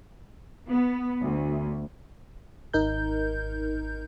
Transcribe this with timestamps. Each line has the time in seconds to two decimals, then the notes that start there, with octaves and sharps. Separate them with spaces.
0.70 B3
1.23 D2
2.74 G#1 D#4 A#4 G6